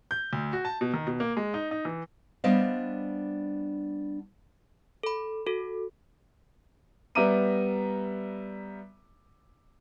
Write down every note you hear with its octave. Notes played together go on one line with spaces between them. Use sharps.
G6
D2
F#4
A5
B2
D#3
B2
A#3
G#3
D#4
D#4
E3
G3 B3 D4 C5 D#5 F5
A4 B5
F#4 A4
G3 B3 E5 A#5 D6 D#7